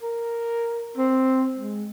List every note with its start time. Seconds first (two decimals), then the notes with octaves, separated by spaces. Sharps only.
0.02 A#4
0.97 C4
1.57 G#3